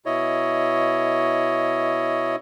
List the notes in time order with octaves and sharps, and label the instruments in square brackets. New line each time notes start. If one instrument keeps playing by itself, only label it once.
[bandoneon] B2 E4 C#5 D#5